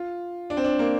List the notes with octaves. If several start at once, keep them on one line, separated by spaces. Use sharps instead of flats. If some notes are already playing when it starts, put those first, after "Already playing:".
Already playing: F4
D4
C4
D4
A#3